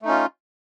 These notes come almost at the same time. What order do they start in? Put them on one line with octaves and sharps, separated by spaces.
A3 D#4 C#4 F4